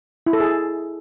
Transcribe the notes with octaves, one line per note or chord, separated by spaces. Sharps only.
E4
A4
G#4